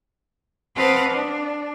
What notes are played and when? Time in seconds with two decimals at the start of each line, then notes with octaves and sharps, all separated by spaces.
0.75 C4 B4 F5 F#5 A5 D#6
1.08 D4